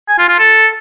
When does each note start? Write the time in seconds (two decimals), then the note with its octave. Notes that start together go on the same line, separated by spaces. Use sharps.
0.08 G#5
0.19 F4
0.29 F4
0.39 A4